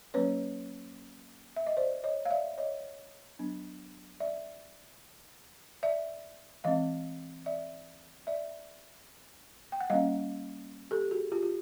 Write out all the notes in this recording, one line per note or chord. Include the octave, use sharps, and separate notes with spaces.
F#3 A#3 C#4 B4 C#5
E5
D#5
C5 D5
C#5 D#5
F5
D5 E5
C#5 D#5
F#3 B3 D4
D5 E5
D5 E5
E3 G#3 C4 D#5 F5
D5 E5
D5 E5
G5
F#5
G3 A#3 C#4 D#5 F5
G4 A4
F#4 G#4
F4 G4
F4